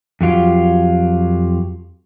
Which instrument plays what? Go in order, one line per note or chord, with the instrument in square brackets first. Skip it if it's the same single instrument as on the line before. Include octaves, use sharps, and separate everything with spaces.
[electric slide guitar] F2 F#3 F4 G4